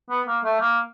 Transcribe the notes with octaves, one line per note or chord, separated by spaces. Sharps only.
B3
A#3
A3
A#3